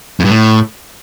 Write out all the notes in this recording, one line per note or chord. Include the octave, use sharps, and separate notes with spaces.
F2
G2
A2